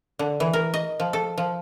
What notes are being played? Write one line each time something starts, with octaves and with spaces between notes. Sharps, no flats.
D3
E3
A#4
D#5
F3
A4
F3